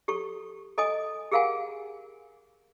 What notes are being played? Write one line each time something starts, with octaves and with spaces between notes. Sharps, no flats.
G4 A4 C#6
A4 D#5 G#5 D#6
G4 G#4 A#4 F5 F#5 G#5